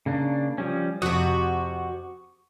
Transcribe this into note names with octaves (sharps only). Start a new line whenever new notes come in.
C#3 A#3 D4
F3 G3 C#4
F2 C3 C4 F#4 C#6 D#6